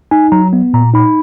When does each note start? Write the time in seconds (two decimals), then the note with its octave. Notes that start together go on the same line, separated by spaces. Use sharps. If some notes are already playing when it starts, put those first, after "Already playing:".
0.11 D#4 G#5
0.32 F#3 A#5
0.53 B3
0.74 A#2 A#5
0.94 D#4 B5